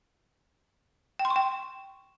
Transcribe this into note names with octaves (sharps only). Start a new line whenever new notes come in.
G5
C6
C#6
G5